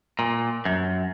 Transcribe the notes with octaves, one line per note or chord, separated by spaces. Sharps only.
A#2
F#2